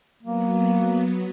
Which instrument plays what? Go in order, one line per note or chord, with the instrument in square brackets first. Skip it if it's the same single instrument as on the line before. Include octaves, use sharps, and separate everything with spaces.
[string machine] F#3 B3 [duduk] A#3